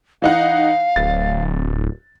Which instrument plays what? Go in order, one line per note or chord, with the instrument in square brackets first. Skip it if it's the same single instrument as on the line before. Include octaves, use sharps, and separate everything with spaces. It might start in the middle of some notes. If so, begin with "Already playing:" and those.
[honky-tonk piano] E3 D#4 F#5 [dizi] F5
[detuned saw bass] D1 [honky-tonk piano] A6